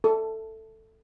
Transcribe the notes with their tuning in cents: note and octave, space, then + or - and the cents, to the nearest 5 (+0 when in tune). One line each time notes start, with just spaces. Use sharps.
A4 +5